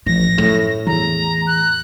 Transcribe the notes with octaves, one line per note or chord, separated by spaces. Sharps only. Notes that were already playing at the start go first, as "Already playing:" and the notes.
A1 F3 A#6
F#2 A2
E2 A#5
F#6